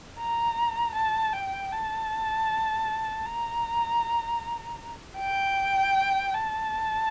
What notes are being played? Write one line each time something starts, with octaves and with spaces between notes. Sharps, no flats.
A#5
A5
G5
A5
A#5
G5
A5